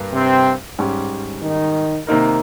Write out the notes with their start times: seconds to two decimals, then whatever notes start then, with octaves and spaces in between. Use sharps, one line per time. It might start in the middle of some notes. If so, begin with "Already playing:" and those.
Already playing: G2 G3 A#3
0.14 C3 C4
0.79 G#2 G3 C#4 G4
1.42 D#3 D#4
2.07 C3 D#3 A#3 D#4 A#4